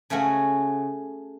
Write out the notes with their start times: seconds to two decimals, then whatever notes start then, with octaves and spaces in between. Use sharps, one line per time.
0.10 C#3 A3 C#4 F#4